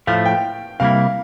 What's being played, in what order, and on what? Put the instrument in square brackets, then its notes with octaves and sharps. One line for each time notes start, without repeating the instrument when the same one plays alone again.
[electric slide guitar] A2 F3 A3 [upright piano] F5
[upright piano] G5
[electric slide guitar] C3 G3 A#3 E4 [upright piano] F5